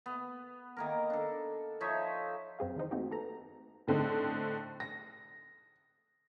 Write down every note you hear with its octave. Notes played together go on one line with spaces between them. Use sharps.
B3
D#3 A#3 A#4
D4 A4
F3 D#4 C#5 E5
F#2 C4 G#4 F5
D#3 E3 D#4 C5
A3 A#3 C4 D#4 F#4 G4
A4 B4 A#5
A2 D3 C4 D#4
A#6